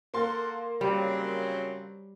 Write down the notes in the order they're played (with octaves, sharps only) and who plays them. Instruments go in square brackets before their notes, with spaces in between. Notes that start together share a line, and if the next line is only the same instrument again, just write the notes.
[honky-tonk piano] A#3 C6 [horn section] A4 A#4 F#5
[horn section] C#3 F#3 C4 [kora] G3